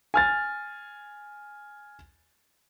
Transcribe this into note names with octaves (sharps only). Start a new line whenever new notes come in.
G#5 F6 A6